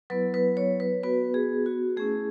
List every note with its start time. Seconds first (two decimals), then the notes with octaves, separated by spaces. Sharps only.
0.10 F#3 B3 E4 B4
0.34 B4
0.57 C#5
0.80 B4
1.03 B3 F#4 B4
1.34 G#4
1.66 F#4
1.97 A3 C#4 E4 G#4